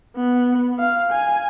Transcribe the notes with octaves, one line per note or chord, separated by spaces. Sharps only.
B3
F5
G#5